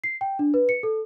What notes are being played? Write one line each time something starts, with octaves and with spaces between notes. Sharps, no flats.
C7
G5
D4
B4
C#7
A4